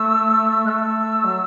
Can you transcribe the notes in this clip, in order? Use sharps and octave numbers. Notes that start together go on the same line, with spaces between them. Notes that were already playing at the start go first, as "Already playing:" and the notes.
Already playing: A3 E6
A3 E6 F#6
F#3